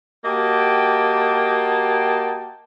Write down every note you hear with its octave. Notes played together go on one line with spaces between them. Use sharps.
A#3 F#4 G4 D#5 G5 A5